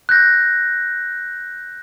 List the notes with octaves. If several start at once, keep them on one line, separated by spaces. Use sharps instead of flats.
F#6 G6 A#6